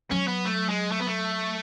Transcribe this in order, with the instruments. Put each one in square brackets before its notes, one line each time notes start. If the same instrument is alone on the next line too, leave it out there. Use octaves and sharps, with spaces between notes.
[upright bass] F#3 [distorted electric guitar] C#4
[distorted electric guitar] B3
A3
G#3
A3
B3
A3